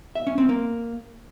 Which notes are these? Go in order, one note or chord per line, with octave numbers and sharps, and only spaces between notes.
E5
C#4
C4
A#3